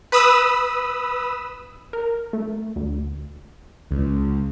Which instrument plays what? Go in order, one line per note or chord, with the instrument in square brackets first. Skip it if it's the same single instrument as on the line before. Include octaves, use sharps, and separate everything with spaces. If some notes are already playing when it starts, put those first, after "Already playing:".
[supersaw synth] B4 B5 D#6 E6
[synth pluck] A#4
A3
D2
[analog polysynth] C#2